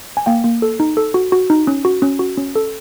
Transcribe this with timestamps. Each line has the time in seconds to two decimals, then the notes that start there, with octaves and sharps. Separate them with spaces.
0.17 G#5
0.26 A#3 F5 G5
0.44 A#3
0.62 A4
0.80 D#4
0.97 A4
1.14 F#4
1.32 F#4
1.50 D#4
1.67 C#4
1.85 F#4
2.02 C#4
2.19 F#4
2.37 C#4
2.56 A4